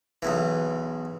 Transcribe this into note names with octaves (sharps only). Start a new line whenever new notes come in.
B1 E2 E3